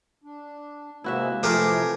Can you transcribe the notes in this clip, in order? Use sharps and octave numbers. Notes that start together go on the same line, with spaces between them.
D4
C3 G#3 A#3 E4 F#4 E5
C3 E3 F3 A3 F4 G4 G#4 A#4